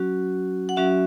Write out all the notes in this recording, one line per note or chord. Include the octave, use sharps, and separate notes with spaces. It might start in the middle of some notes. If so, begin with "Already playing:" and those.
Already playing: F#3 C#4 F#4
F#5
F#3 C#4 F#4 E5